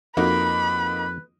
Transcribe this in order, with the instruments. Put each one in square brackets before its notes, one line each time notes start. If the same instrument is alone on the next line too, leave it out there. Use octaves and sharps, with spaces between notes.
[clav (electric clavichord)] F2 [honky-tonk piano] A#3 D#4 F#4 [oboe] B4 [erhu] B5